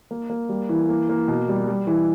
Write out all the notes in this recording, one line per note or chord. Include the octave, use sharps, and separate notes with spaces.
A#3
A#3
G3
E3
A#3
A#3
B2
G3
G3
E3